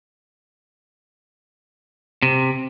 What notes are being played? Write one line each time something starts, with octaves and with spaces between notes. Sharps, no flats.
C3